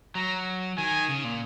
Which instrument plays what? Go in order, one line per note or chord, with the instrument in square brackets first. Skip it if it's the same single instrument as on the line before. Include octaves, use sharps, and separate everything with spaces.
[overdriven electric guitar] F#3 [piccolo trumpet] A#5
[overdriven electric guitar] D#3 [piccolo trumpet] G#5
[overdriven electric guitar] C#3
A#2